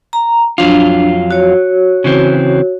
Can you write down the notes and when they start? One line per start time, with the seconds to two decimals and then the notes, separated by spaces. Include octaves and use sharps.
0.13 A#5
0.58 F2 F#3 D4 F4
1.31 F#4 C#5
2.04 C#3 E3 C4